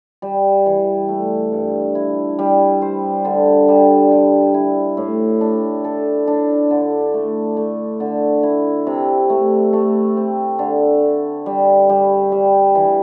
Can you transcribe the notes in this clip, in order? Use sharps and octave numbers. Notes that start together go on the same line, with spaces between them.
G3
E3
A3
G2
E4
G3
C5
D3
G3
G3
E4
A2
D4
A4
D4
D3
A3
A3
D3
E4
C3
A3
A3
C4
D3
D3
G3
G3
G3
E3